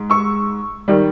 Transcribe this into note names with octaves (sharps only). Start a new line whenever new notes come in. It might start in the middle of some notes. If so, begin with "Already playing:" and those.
Already playing: G#2
C#6 E6
D#3 G3